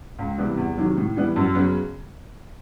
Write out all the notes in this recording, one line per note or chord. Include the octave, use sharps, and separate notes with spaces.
C#2
C3 E3 G3 B3
E2
C3 D#3 F#3
A2
E3 G3 B3
F#2
C#3 F#3 B3